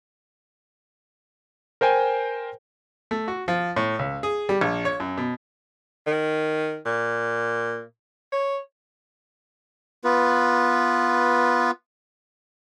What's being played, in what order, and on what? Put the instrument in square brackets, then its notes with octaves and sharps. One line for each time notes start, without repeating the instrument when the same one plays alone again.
[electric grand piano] A#4 C5 G5 G#5
[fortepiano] A3
F#4
F3
A2
C#2
G#4
G3
A#1
C#5
F#2
B2
[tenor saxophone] D#3
A#2
C#5
[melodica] B3 F4 B4